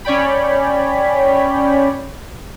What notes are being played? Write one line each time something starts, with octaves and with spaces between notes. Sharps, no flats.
C#4 C#5 D5 G5 B5